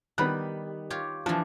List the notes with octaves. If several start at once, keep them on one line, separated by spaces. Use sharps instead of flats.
D#3 G3 B3 B5 F#6
F4 G4 C#5
E3 F3 D4